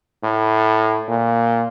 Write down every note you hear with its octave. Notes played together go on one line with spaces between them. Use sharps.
A2
A#2